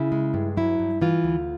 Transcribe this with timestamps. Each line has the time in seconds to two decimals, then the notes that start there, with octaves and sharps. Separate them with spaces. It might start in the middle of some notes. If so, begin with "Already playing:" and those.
Already playing: C#3 E4
0.12 G#3
0.34 G2
0.57 F#3 E4
0.80 G2
1.02 E3 F4
1.24 D2